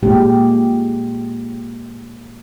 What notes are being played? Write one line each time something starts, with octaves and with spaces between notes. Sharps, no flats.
A#2 G#3 G4